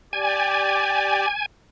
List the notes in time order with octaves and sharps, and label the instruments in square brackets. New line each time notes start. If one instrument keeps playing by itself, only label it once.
[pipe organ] G4 D5 [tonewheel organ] G#5